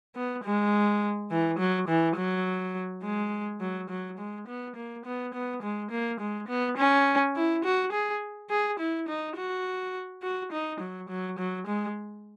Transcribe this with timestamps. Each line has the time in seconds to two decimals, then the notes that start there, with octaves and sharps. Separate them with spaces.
0.16 B3
0.44 G#3
1.31 E3
1.59 F#3
1.88 E3
2.17 F#3
3.03 G#3
3.61 F#3
3.90 F#3
4.18 G#3
4.48 B3
4.76 A#3
5.05 B3
5.34 B3
5.62 G#3
5.91 A#3
6.20 G#3
6.48 B3
6.77 C#4
7.36 E4
7.64 F#4
7.92 G#4
8.50 G#4
8.79 E4
9.08 D#4
9.36 F#4
10.22 F#4
10.52 D#4
10.81 F#3
11.09 F#3
11.39 F#3
11.67 G#3